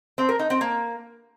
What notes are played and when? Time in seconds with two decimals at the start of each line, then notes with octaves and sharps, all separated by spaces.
0.18 C4
0.29 A#4
0.39 D#4
0.50 C4
0.61 A#3